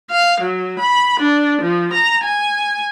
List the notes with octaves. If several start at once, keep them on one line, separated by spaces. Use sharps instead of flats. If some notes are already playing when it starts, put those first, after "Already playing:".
F5
F#3
B5
D4
F3
A#5
G#5